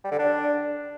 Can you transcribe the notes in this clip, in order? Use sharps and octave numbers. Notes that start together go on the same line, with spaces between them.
G3
D3
D4